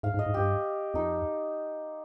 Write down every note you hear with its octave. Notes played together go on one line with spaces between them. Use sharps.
G#2 F5
G#2
D#5
G#2
G2 G4
F2 D#4